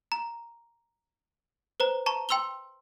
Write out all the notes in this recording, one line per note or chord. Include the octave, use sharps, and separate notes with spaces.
A#5
B4 C5 A#5
A5 A#5 C#6
G5 C6 E6 F7 G7